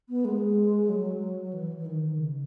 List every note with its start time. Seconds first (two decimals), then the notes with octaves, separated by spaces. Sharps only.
0.09 B3
0.25 G#3
0.89 F#3
1.53 E3
1.77 E3
1.86 D#3
2.02 D#3
2.18 C#3